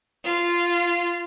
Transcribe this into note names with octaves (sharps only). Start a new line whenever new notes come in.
F4